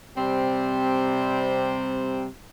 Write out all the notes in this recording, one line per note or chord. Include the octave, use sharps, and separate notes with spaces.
C3 G3 C4